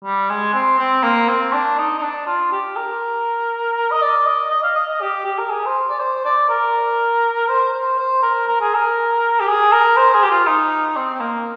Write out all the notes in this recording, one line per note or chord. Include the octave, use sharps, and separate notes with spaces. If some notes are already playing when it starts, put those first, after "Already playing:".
G3
G#3
C4
C4
A#3
C4
D4
D#4
D#4
D4
F4
G4
A#4
D#5
D5
D#5
D#5
F5
D#5
D#5
G4
G4
A#4
G#4
C5
D5
C5
D5
A#4
C5
C5
C5
A#4
A#4
G#4
A#4
G4
G#4
A#4
C5
G#4
G4
F4
D#4
C4
C4
A#3